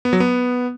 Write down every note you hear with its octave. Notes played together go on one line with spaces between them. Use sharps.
B3
F#3
B3